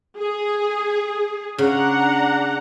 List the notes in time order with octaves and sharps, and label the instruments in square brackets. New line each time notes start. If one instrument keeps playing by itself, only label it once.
[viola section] G#4
[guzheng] C#3 [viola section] D4 F#5 A#5